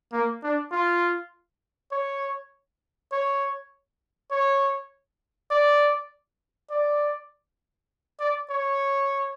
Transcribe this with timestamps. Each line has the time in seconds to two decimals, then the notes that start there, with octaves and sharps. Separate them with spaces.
0.13 A#3
0.43 D4
0.72 F4
1.92 C#5
3.12 C#5
4.31 C#5
5.51 D5
6.70 D5
8.20 D5
8.50 C#5